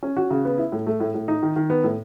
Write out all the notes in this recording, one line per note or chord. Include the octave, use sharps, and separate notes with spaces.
C#4
F#4
C#3
B3
E4
A2
A3
A2
A2
D#4
D#3
D#3
B3
A2